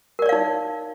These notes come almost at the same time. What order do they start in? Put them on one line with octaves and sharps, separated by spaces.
A#4 D5 C#5 F5 D#4